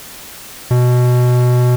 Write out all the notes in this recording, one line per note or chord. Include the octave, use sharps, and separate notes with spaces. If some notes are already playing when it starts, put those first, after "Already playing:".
B2